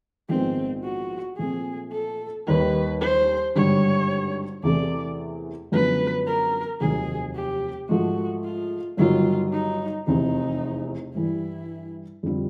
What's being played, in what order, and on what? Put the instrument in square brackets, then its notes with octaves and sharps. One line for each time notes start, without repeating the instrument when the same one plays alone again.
[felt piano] A#1 G#2 D#3 G#3 B3 [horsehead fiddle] C4
[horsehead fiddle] F#4
[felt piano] A#2 F3 A3 C4 [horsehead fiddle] G#4
[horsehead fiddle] A4
[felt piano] D#2 D#3 G3 [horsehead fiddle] B4
[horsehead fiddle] C5
[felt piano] G#1 G2 D3 G3 [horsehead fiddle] C#5
[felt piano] E2 C3 E3 A3 [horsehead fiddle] D5
[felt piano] F#2 D3 F3 G#3 B3 [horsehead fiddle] B4
[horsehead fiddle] A#4
[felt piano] F1 D#2 D#3 F#3 [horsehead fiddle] G#4
[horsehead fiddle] G4
[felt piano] G#2 F3 A3 [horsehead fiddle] F#4
[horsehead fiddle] F4
[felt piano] G1 G2 D#3 F#3 [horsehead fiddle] F4
[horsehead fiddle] D#4
[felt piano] F1 E2 C3 [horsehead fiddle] D#4
[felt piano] G2 E3 G3 [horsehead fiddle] E4
[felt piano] F2 D3 G3 C4 F4